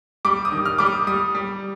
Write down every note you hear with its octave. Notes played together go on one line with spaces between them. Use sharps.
G3 D6
D#6
D#3
F6
G3 D6
D#6
G3 D#6
G3